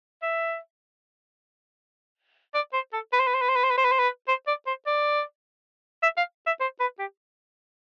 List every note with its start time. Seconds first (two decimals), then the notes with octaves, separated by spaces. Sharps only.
0.22 E5
2.54 D5
2.73 C5
2.93 A4
3.13 B4
3.20 C5
3.27 B4
3.34 C5
3.41 B4
3.49 C5
3.56 B4
3.63 C5
3.70 B4
3.78 C5
3.85 B4
3.92 C5
3.99 B4
4.28 C5
4.47 D5
4.67 C5
4.86 D5
6.03 E5
6.17 F5
6.46 E5
6.61 C5
6.80 B4
6.99 G4